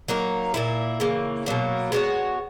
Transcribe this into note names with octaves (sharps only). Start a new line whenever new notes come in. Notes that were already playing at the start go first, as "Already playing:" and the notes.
F#3 A#3 D#4 A#4
A#2 A#3 E4
C#3 E3 A#3
B2 F#3 A#3
G#3 B3 F#4 C#5